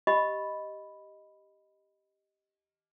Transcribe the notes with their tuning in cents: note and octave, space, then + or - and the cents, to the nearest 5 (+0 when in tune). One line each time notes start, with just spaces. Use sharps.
G4 +0 D#5 +0 B5 +0